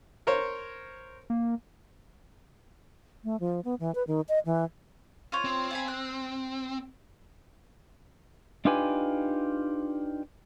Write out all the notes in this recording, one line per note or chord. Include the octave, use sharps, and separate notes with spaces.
A#4 C5 C#5
A#3
A3
F3
B3
E3
B4
D#3
D#5
E3
F4 C5 C#5
C4
F5 G#5 B5
F#6
D4 D#4 F4 G4 B4 G#5